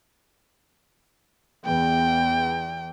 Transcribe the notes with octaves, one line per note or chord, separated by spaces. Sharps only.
E2 G5